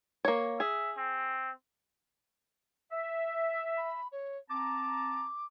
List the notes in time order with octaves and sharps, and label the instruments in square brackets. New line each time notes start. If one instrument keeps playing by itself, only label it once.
[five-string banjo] A#3 C#5
[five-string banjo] G#4 [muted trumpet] E5
[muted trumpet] C4
[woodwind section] E5
[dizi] B5
C#5
[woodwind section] C4 A5 A#5 [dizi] D6